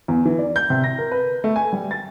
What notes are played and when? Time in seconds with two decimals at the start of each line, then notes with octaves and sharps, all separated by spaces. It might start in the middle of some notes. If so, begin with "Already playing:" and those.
0.08 E2
0.25 E3
0.39 D5
0.56 G6
0.70 C3
0.84 A#6
0.98 A#4
1.11 B4
1.44 A3
1.56 G#5
1.73 G3
1.91 A6